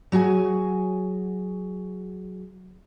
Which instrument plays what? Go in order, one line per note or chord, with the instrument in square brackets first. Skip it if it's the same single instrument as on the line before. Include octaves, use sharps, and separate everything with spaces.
[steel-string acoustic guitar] F#3 F#4 G#4 G#5